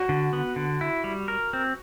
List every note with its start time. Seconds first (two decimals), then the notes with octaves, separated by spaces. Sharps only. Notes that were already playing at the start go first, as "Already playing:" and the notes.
Already playing: F#4
0.09 D3
0.33 B3
0.56 D3
0.81 E4
1.04 G3
1.28 A#4
1.53 C4